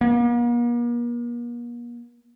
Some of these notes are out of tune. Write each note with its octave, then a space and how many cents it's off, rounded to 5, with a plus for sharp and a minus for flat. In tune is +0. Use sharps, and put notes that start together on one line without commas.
A#3 +45